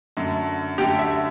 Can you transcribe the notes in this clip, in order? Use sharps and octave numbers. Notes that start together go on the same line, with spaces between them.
F#2 D3 A3
F#2 D3 A3 G4
E5